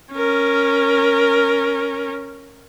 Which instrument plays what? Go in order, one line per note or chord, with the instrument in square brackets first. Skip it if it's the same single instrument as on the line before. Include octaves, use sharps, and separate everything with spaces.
[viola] C#4 A#4